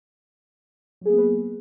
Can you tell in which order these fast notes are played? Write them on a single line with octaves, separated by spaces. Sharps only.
F#3 G#4 A#3 B3 B4